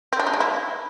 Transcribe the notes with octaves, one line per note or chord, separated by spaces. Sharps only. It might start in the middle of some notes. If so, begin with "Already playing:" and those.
C4
D4
D#4
G#3
E4